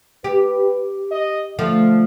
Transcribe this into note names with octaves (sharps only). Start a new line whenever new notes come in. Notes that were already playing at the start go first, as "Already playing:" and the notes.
G4 B4
D#5
D3 F3 A3